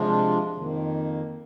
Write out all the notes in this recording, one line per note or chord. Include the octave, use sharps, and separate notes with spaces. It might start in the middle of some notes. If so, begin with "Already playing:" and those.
Already playing: C3 F3 G#3 D4 F4
F2 D#3 A#3